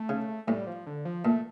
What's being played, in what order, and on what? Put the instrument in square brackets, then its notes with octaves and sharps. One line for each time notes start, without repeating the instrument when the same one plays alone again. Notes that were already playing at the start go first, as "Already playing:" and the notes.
Already playing: [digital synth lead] A3
[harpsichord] C#3
[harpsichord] A2 [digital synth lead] G3
[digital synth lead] F3
D3
F3
[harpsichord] A#2 [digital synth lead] A3